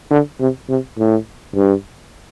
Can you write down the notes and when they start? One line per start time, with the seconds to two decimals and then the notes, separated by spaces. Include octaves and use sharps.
0.11 D3
0.40 C3
0.69 C3
0.98 A2
1.56 G2